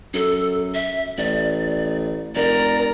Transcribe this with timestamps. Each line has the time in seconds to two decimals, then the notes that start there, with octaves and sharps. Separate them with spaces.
0.14 F#2 A4
0.74 E5
1.18 A1 D5
2.35 F1 A#4 D5